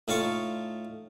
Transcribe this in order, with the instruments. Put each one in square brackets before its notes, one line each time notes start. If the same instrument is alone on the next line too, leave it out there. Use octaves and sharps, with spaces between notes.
[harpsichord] A2 D#4 F4 A5 C#6